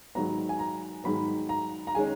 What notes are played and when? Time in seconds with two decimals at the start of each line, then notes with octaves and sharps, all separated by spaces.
0.15 G#2 D#3 F#3 B3 A#5
0.49 G#5
0.59 A#5
1.04 G#2 D#3 F#3 B3 B5
1.49 A#5
1.87 A#5
1.95 D#3 G#3 C#4 G#5